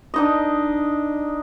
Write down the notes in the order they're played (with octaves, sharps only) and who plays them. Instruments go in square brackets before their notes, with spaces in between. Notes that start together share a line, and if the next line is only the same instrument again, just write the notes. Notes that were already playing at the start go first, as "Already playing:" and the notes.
[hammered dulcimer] D4 D#4 D#5